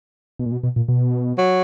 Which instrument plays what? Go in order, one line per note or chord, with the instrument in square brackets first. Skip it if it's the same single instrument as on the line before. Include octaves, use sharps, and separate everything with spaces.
[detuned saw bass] B2
A#2
B2
B2
A#2
B2
[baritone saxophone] F#3